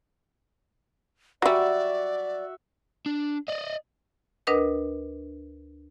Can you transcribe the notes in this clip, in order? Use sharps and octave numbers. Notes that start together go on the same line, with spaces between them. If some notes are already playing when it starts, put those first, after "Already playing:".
F#3 G3 F#4 D5 E5
D4
D5 D#5
D2 D4 A#4 B4 D#5 D#6